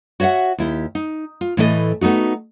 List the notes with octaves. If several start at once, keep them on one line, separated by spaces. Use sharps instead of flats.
F#4 C#5 D#5 E5 F#5
D#2 E4 G4
D#4
F4
A2 E3 A3 A4 A#4 D#5
A3 B3 D#4 F#4